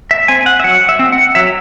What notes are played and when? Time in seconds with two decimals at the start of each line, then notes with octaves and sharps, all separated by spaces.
0.11 E5
0.28 C4 G#5
0.46 F#5
0.60 E5
0.64 F#3 F#5
0.89 E5
0.99 C4
1.12 F#5
1.35 F#3 E5